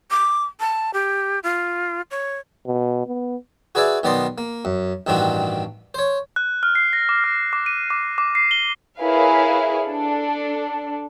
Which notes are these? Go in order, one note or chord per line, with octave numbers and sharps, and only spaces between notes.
D6
A5
G4
F4
C#5
B2
B3
F#4 G#4 B4 D5 E5 G#5
B1 D#3 B3 D5 D#5 C6
A#3
F#2
A1 G2 D#3 C4 D4 F#4
C5 C#5
F#6
F6
C7
A#6
D6
F6
D6
D#7
D6
D6
C7
G7
E4 G#4 A#4 B4 C#5 F5
D4 A4